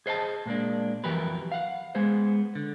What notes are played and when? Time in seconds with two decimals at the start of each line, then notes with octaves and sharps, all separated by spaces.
0.06 G#4 C5 D#5 G5 A5
0.46 A#2 G#3 A#3 D4
1.04 F2 E3 F#3 G4 A#4 B4
1.52 F5 F#5
1.95 G#3 B3 G#4 C5
2.55 D3